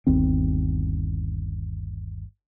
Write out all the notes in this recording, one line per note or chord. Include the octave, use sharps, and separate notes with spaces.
G1 D#2 C4